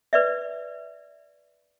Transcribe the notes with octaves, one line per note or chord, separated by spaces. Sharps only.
B4 D5 E5